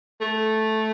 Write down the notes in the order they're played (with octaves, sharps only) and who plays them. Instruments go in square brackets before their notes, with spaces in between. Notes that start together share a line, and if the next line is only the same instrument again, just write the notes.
[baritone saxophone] A3